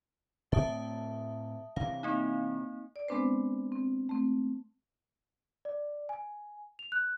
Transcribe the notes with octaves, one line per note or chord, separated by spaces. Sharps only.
A2 C4 E5 A5 D#6
C3 E3 F5
A#3 C4 D#4
D5
G#3 B3 C4 D4 B4 C5
C4
A3 C4
D5
G#5
F7
F#6